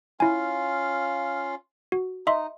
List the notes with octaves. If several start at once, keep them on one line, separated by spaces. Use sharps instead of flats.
C#4 E4 F4 F5 G#5
F#4
D#4 D#5 E5 C6